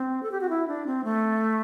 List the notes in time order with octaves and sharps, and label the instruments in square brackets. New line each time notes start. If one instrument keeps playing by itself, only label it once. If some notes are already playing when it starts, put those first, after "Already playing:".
Already playing: [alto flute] C4
A4
G4
F#4
E4
D4
C4
A3